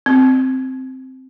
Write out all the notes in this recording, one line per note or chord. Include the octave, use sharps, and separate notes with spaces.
C4